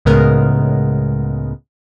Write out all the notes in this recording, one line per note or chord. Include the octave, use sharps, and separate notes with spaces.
C#2 A2 C#3 G#3 B3 A#4